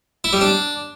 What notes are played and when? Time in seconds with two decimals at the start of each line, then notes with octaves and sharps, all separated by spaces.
0.24 E4
0.33 G3
0.41 D4